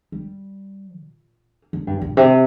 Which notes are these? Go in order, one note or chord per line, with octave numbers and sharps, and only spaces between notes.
G3
A#2
D3
G2
A#2
C3